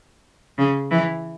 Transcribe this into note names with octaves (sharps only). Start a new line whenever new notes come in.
C#3
E3